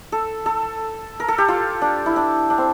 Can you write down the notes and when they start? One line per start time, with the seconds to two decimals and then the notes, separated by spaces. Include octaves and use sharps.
0.12 A4
0.46 A4
1.20 A#4
1.28 A4
1.38 G4
1.48 F4
1.82 D4
2.06 E4
2.16 D4
2.50 D4
2.58 C4